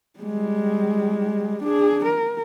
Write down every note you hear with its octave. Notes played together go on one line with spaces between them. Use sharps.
G3 G#3
D4 G#4
A#4